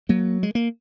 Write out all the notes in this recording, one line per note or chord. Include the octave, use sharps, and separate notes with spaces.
F#3 A#3
G#3
A#3